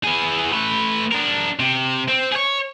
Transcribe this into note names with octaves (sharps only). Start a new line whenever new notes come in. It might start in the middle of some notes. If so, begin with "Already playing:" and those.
E3 G#4
A3 B4
D4 A#4
C3
C4
G#4 C#5